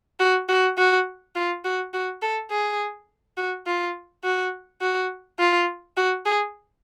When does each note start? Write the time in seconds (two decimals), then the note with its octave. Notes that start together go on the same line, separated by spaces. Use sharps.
0.20 F#4
0.49 F#4
0.78 F#4
1.35 F4
1.65 F#4
1.94 F#4
2.22 A4
2.51 G#4
3.37 F#4
3.66 F4
4.24 F#4
4.81 F#4
5.39 F4
5.97 F#4
6.25 G#4